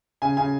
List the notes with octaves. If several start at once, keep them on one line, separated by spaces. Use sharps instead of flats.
C#3 G#5
C#3 G#5